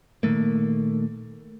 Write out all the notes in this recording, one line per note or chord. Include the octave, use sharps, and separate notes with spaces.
A#2 D#3 A3 A#3